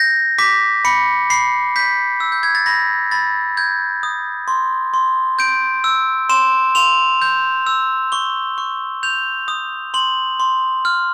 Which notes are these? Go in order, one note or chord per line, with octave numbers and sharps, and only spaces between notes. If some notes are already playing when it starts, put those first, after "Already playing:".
Already playing: G6 A#6
D6 B6
B5 C#7
B5 C7
G6 B6
E6
G6
G#6
A6
B5 A#6
B5 A6
G6 G#6
D#6
C6
C6
G6 D7
E6
C6 E7
C6 F7
G6
E6
C#6 G7
C#6
G6 F7
D#6
C6 F#7
C6
F6